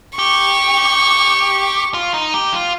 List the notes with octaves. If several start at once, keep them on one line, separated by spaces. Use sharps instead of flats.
G4 C#6
F4
D#4
G4
F4